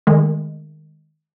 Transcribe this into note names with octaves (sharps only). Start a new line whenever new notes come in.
D#3 G#3 A3